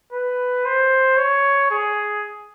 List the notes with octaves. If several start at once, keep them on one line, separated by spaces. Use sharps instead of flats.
B4
C5
C#5
G#4